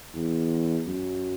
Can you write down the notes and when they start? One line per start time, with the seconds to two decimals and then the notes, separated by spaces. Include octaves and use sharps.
0.14 E2
0.86 F#2